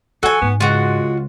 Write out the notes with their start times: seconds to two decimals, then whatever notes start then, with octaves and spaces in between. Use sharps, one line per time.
0.23 F3 F#4 A4 G#5
0.42 G#2 B3
0.60 C#2 G#3 F4 F#4